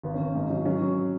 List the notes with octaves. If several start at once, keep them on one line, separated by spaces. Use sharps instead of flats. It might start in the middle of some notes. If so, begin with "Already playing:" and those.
G#1 B3
C#4
G#1
G#2
F#3
F#3 C#4
F#3